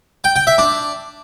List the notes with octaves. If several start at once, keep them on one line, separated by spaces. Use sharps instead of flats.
G5
G5
E5
D4